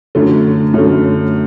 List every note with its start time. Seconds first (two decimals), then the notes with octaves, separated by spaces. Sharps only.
0.15 F#2 D3 A3
0.74 F#2 D3 A3